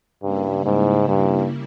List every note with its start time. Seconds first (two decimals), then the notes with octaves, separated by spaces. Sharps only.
0.22 G2 C#3 G3 A#3 E4
0.65 G#2
1.08 G2